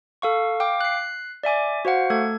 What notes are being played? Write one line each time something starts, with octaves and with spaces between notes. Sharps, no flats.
A4 F5 C#6
F5 G5 D6
F#6 C7
D5 E5 G#5 D6
F#4 C5 F5 F#5
A3 A4 G#6